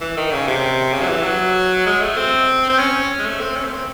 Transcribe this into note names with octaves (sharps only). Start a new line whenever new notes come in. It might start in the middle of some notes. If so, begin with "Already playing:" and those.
E3
D#3
C#3
C3
C#3
F#3
E3
F#3
G#3
A3
C4
C4
C#4
G#3
A3
C4
C#4
A3
C4